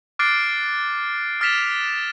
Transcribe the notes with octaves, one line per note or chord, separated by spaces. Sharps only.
D6 F6 F#6 A6 C7 D7
D#6 F6 A6 B6 E7 F7